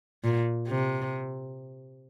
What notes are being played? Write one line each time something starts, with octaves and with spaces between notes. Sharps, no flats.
A#2
C3